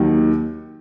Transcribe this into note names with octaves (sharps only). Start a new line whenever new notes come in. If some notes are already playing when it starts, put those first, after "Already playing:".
Already playing: D#2 D#3 F#3